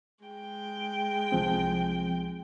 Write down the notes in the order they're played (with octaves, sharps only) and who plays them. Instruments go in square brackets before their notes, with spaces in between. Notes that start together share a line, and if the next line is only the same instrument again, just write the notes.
[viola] G#3 G5
[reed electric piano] C2 F3 C4